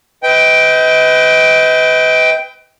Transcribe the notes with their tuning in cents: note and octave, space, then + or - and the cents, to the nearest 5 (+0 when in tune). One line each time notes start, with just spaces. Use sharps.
B4 +30 D#5 +35 G5 +0